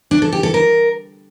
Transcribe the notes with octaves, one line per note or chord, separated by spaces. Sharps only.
D4
A4
G4
A4
A#4